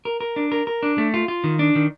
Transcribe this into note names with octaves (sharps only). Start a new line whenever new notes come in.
A#4
A#4
D4
A#4
A#4
D4
A3
F4
F4
D#3
D4
D#3